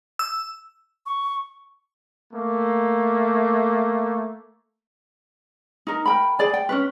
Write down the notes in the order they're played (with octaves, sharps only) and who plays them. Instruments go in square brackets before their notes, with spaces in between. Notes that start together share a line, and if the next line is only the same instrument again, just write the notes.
[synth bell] E6
[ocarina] C#6
[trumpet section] A3 A#3
[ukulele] D#4 A#4
A#4 G5 B5
G#4 D5 G#5
G5
C#4 D4 B4